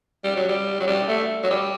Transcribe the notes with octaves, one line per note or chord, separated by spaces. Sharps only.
G3
F#3
G3
F#3
G3
A3
F#3
G3